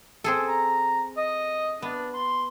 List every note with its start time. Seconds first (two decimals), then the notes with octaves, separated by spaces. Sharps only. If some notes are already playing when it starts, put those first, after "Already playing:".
0.24 C4 G#4 A4
0.48 A#5
1.17 D#5
1.82 B3 D4
2.14 C6